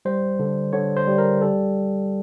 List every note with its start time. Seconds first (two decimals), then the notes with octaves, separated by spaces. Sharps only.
0.05 G3 C5
0.39 D3
0.73 D3 C#5
0.97 C5
1.07 G3
1.18 A#4
1.42 G3 A4